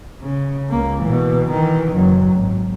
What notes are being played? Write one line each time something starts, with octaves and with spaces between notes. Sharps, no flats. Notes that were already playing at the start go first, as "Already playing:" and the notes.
C#3
C#2 A#3
B2 E3
D#3 E3
F#1 F#3
G#1